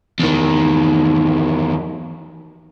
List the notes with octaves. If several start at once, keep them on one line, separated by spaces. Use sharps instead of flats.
E2 D#3